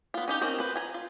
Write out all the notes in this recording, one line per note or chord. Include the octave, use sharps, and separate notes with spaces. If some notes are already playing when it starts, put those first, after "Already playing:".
B3 F4
C#4 D#4 G4
C4 C#4 D#4 A#4
B4 C5
G#5 A#5
F4